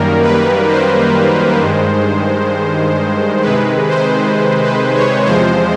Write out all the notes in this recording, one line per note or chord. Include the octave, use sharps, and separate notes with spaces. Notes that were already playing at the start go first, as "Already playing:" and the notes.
Already playing: F#2 D#3 G3 A#3 A#4
B4
C5
G2 D#3 G#3
C3 D#3 G#3 B4
C5
B4
C#5
E2 C3 F3 G#3 C5